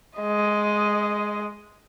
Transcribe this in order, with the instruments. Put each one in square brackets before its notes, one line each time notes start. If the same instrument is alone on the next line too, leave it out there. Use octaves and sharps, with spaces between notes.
[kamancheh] G#3 D#5